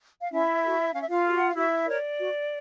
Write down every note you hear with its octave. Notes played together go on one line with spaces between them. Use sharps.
F5
C#4 E4 E5
F#4 A4
C#4 F5
E5
F4 F5
F#4 A4
F#5
F5
E4 F#4 E5
A#4 C#5 D5
F#4